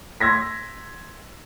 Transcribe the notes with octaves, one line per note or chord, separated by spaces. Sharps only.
C6 E6 G#6 A#6 B6